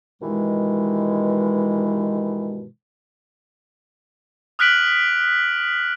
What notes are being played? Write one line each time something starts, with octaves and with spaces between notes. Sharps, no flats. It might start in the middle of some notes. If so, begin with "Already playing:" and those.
G2 B2 D#3 E3 G#3
D#6 F6 F#6 B6 D7 F#7